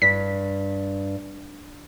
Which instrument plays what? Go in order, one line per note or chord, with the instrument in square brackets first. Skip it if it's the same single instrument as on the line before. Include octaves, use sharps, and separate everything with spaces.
[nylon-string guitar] G2 [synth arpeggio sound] B6